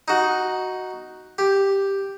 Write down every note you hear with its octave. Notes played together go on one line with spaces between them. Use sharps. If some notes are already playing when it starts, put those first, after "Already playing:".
D#4 F#4
G4